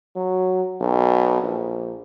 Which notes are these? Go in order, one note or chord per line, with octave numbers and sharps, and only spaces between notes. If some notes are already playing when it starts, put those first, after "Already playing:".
F#3
B1
A#1